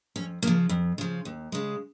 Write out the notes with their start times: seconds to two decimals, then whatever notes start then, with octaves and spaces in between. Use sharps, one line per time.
0.16 F2 C#4
0.42 C#3 F3 A#3
0.69 F2
0.98 C#3 F3
1.25 D#2
1.52 C#3 G#3